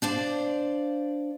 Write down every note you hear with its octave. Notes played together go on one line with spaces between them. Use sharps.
D4 C5 D5 F5